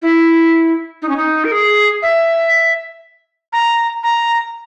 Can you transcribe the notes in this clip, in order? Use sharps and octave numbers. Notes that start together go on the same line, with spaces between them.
E4
D#4
C#4
D#4
A#4
G#4
E5
A#5
A#5